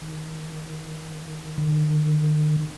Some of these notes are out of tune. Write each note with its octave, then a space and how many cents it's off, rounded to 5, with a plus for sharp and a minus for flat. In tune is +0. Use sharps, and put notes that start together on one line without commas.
D#3 +20
D#3 -40